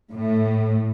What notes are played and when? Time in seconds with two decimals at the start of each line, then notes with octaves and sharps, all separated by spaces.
0.12 A2